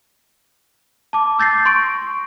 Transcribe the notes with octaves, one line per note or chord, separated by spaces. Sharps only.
A5 D6
E6 G6 A6 A#6 C7
C6 C#6 D7